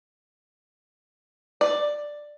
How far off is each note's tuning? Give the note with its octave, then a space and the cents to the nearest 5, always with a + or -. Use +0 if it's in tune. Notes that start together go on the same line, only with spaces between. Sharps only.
D5 +5